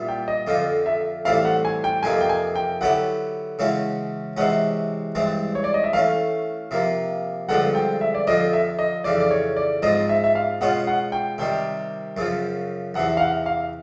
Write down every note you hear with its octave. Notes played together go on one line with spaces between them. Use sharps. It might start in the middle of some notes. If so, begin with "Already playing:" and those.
Already playing: A#2 G3 B3 E4
G5
D#5
F2 D3 F3 D#5
E5
A2 E3 G3 C4 E4 F5
F#5
G#5
G5
F2 C3 F3 A#3 D#4 G#5
G5
G#5
G5
D3 F#3 B3 E4 G4 F#5
C#3 E3 G#3 C#4 F#4
C3 E3 G#3 C#4 F#5
G2 E3 G#3 C4
C#5
D5
D#5
E5
E3 A3 C#4 F5
C3 F3 A#3
G2 D3 F3 G#3 C4 F#5
G5
E5
D5
F2 D3 F3 D#5
E5
D#5
F2 C#3 E3 D5
D5
C#5
D5
G#2 F3 G#3 C4 D#5
E5
E5
F5
B2 G#3 C#4 F4 F#5
F#5
G5
C3 D#3 G3 G5
F#2 C#3 F3
E2 C3 E3 F#5
F5
F#5
F5